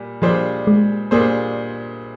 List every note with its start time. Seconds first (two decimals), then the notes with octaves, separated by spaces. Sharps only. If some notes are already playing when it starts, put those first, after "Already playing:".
Already playing: A#2 G3
0.22 A#2 F3 G3 D4 G#4 C5
0.67 G#3
1.11 A#2 G3 A#3 D4 G#4 C5